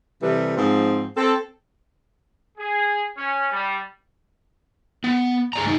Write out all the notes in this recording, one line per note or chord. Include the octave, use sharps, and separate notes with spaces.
C3 E3 G3 A4 B4
G#2 F3 C4
C4 A4
G#4
C#4
G3
B3
G#4 D5 A#5
A3 D#4